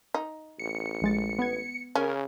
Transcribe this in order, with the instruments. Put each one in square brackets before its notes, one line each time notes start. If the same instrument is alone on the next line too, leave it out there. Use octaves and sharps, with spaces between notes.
[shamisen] D#4
[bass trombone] A1 [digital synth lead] C#7
[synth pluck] A#1 G#3 A6
B3 G#6
[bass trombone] C#3 [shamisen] C#4 [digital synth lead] A#4